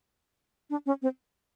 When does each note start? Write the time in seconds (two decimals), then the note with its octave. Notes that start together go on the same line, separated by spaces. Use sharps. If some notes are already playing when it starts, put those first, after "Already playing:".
0.70 D4
0.86 C#4
1.02 C4